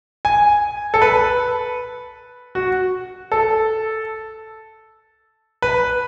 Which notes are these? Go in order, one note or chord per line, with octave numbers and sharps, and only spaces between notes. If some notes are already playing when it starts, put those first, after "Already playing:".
G#5
A4
B4
F#4
A4
B4